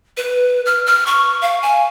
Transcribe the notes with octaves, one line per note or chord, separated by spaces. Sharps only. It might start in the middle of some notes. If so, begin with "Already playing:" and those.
B4
F6
F6
C#6
F5
G#5